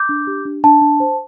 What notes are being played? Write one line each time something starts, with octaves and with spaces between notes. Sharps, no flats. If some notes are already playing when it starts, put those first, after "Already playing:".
Already playing: D6 G6
D4
G4
D4
D4 A5
D4
C5